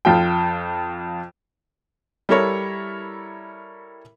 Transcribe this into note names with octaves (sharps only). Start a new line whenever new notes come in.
F2 F4 G5
G3 E4 A4 A#4 C#5